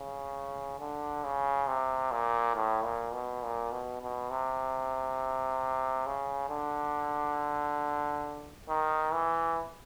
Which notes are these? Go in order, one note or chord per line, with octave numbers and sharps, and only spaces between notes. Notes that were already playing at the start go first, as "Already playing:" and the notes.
Already playing: C#3
D3
C#3
C3
A#2
A2
A#2
B2
A#2
B2
B2
C3
C#3
D3
D#3
E3